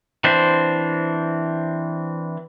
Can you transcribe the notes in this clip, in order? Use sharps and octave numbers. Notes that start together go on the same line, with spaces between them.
E3 C4 D4 C5